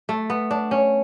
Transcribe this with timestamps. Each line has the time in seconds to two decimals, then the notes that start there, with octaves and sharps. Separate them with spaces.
0.09 A3
0.30 B3
0.51 D4
0.71 C#4